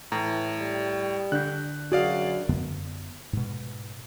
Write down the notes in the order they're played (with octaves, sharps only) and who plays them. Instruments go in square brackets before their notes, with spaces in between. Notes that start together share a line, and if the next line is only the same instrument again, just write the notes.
[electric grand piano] A2 [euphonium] E3 [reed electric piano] A#5
[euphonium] G3
[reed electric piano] D3 D4 G6 [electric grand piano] F#6
[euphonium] F#2 [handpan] F#4 [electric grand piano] G#4 D5 F5
[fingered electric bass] F#2 D3 B3
G#2 B2